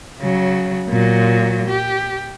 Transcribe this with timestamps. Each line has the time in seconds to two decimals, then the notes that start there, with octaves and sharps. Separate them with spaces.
0.19 C#3 F#3
0.89 A#2 F#3
1.68 G4